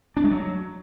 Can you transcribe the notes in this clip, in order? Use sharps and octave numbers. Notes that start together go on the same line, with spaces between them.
D4
G#3
F#3